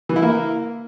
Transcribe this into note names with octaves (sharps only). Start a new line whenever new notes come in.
E3
E4
A#3